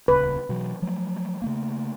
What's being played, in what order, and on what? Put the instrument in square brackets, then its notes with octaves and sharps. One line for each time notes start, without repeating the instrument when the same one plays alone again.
[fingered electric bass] D#1 C#2 C#3 [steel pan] B4
[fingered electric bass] B2 E3 F#3
F3 F#3 A3
C#3 A3 A#3